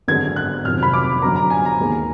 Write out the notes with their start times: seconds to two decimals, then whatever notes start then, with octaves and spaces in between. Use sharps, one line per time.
0.08 G#1 F#2 D3 G#3 B3 G#6
0.36 F#6
0.65 F1 F2 D#3 F#3 F6
0.83 B5
0.93 D6
1.22 F#2 D3 F#3 B3 A#5
1.36 A#5
1.50 G#5
1.65 A#5
1.79 D#2 D#3 G#3 B3